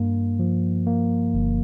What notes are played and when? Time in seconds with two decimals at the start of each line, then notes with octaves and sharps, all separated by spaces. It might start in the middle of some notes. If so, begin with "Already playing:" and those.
Already playing: G2 A#3
0.40 F3
0.87 A#3
1.34 G1